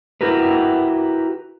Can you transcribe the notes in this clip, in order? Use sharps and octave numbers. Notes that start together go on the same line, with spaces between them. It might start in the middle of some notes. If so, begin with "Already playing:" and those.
E4 F#4 G4 A#4 B4